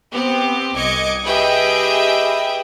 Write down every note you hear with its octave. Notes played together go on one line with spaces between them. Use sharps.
B3 C4 G4
C2 D#5 D6 G#6 C#7
G4 G#4 B4 D#5 E5 G5